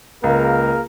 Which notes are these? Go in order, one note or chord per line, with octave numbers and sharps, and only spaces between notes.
C#2 A#3 G#4 A#4